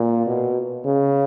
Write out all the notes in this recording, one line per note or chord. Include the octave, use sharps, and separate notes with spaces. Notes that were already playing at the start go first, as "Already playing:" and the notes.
Already playing: A#2
B2
C#3